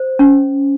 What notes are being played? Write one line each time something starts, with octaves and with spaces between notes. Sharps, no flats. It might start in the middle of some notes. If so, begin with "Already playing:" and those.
Already playing: C5
C#4